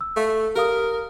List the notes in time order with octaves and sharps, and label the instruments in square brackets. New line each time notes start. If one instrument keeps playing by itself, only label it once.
[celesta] E6
[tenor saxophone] A3 [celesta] F5
[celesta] G4 F5 D#6 [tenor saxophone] A#4